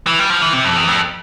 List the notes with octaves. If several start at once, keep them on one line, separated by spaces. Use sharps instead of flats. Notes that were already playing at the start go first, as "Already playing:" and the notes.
E3
G3
F3
E3
C3
F2
E2
F2